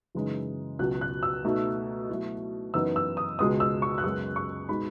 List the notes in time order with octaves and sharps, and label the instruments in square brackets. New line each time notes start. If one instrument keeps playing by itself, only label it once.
[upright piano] F#2 C#3 E3 G#3 D#4
C#2 B2 F#3 F#6
F#6
E6
B2 A3 D#4
B2 F#3 A3 E4
F#2 E3 B3 D#4 E6
E6
D#6
C#2 B2 G#3 D#6
E6
C#6
F#6
F#2 C#3 G#3 B3 E6
C#6
B2 G#3 D#4 B5